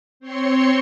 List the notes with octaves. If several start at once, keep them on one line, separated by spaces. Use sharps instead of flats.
C4 C#5 C6 C#7